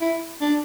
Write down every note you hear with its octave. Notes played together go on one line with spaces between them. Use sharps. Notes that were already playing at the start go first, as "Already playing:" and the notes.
E4
D4